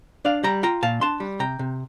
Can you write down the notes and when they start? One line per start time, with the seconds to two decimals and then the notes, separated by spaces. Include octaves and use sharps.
0.25 D4 D5 F5
0.44 G3 G5 A#5
0.63 F4 G5 A#5
0.83 A#2 F5 A5
1.01 D4 A5 C6
1.20 G3
1.39 C3 G5 A#5
1.59 C3